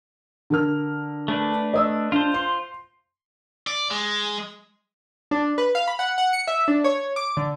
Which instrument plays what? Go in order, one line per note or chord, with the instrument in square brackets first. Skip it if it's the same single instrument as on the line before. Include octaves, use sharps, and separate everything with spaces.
[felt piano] D3 A#4 F6
[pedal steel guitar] A3 D4 B4
[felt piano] D#5 D#6 E6
[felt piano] D4 [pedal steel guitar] F4 C5
[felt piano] C6
[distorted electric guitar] D5
G#3
[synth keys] D4
B4
F5
B5
F#5
F#5
C#7
E5
D4
C#5
D6
D3